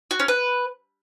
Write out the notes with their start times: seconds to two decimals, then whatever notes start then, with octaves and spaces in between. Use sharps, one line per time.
0.11 F#4
0.20 C#4
0.28 B4